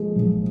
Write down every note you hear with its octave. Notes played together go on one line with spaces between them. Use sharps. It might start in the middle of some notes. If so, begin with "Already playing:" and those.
Already playing: F3 G#3 G#4
A#1